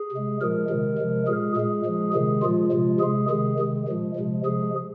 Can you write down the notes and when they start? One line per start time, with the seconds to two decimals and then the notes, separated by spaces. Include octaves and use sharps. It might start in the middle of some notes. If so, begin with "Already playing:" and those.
Already playing: G#4
0.12 C3 G#3
0.41 A#2 F3 G#3 A#4
0.69 C3 D#3 G#3
0.98 C3 F3 G#3
1.27 A#2 G#3 G#4
1.56 A#2 G#3 G#4
1.85 A#2 F3 G#3
2.13 C3 D#3 G#3 G#4
2.42 A#2 F3 G#3 F4
2.72 C3 F3 G#3
3.00 C3 G#3 G#4
3.29 C3 D#3 G#3 G#4
3.58 C3 D#3 G#3
3.87 A#2 F3 G#3
4.15 C3 F3 G#3
4.45 C3 F3 G#3 G#4